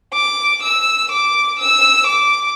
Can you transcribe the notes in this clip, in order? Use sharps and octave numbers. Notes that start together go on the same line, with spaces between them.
D6
E6
D6
E6
D6